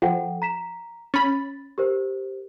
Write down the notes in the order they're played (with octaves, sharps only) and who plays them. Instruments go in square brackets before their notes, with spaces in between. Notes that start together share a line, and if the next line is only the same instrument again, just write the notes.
[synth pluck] F3 [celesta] A4 F#5 G5
[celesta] A#5 B6 E7
[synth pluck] C#4 B5 [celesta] A6
[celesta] G4 A#4 C5